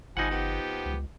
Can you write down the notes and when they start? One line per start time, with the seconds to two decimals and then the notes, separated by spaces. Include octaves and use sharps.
0.17 G1 F3 G3 D#4 F#5 G#5
0.30 F3 B3 G4
0.86 C#2